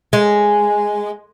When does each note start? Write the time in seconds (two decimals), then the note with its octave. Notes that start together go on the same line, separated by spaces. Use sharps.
0.13 G#3